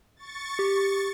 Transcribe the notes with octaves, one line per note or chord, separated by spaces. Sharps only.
C#6 A6
G4